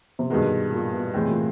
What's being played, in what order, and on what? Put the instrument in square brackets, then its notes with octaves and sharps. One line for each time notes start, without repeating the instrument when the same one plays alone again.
[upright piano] C3
[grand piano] G2 D#3 G#3 [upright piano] B2
[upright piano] A#2
B2
[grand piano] A2 E3 G#3 C4 [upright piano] C3
[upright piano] A#2